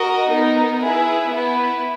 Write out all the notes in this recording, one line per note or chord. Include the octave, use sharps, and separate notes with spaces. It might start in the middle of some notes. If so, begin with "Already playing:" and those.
Already playing: F#4 A#4 D#5
B3 D#4 A#4
E4 G#4 B4
B3 E4 B4